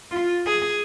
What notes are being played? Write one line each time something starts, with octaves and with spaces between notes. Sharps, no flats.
F4
G#4